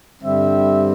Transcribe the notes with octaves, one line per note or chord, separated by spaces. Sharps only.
G2 D3 G3 C4 E5